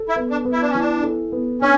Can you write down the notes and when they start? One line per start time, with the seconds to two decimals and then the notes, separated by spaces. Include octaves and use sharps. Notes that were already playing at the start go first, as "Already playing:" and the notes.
Already playing: A4
0.09 E4
0.16 B3
0.30 D4
0.45 B3
0.52 E4
0.61 D4
0.70 C#4
0.75 E3 D4
1.03 A4
1.32 B3
1.62 C#4 D4